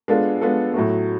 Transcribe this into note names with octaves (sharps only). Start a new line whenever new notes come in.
G#3 B3 D4 F4 A4
G#3 B3 D4 F4 A4
A2 F#3 A3